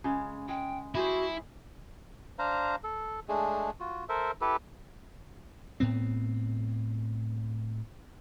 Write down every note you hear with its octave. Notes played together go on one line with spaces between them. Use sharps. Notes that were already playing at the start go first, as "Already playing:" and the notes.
C#3 G#3
G#3 G5
G3 E4 F#4 G#4 C5
D4 C5 F5 A#5
A4
G#3 A3 D4 G#4
F4 F#4
A4 A#4 C5 E5
E4 G4 A4 B4
A2 B3 C4